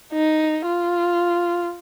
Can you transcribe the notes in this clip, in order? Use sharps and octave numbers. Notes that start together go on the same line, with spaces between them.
D#4
F4